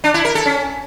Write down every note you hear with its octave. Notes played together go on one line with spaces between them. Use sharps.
D4
E4
A#4
A4
C#4